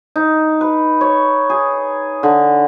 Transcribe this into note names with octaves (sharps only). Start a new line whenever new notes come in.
D#4
B4
C#5
G#4
D3